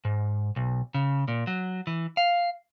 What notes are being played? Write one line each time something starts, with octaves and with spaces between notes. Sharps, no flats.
G#2
B1
C#3
A#2
F#3
E3
F5